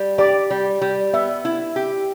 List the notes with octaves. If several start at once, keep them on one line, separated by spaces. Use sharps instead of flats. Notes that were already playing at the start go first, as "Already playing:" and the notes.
Already playing: G3
G4 D5
G3
G3
B3 E5
E4
G4